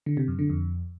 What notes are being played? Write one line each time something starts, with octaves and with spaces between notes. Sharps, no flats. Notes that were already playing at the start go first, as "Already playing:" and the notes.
D3
C3
F#2
D3
F2